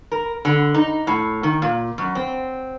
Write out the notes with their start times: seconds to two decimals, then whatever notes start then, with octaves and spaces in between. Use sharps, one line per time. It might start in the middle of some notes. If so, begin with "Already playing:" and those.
0.11 A#4
0.45 D3
0.74 D#4
1.07 A2
1.43 D#3
1.62 A#2
1.98 F#2
2.15 C4